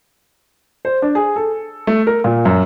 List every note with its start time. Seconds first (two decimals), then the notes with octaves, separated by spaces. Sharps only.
0.85 C5
1.02 D4
1.15 G#4
1.36 A4
1.87 A3
2.07 A#4
2.24 A#2
2.45 F#2